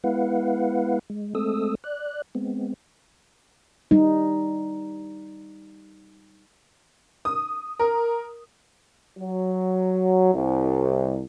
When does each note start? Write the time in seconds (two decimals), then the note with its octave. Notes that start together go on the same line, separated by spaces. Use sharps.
0.04 G#3 B3 E4 B4 F5 F#5
1.10 G#3
1.35 G#3 A3 C4 A4 D#6 E6
1.84 D5 F#6
2.35 G#3 B3 C4
3.91 G3 D#4
7.25 D#6
7.79 A#4
9.19 F#3
10.34 C2